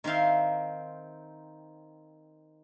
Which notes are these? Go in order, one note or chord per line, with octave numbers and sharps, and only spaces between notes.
D#3 C4 E5 F5 C6